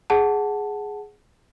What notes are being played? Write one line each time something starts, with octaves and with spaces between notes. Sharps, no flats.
G#4 F#5 A5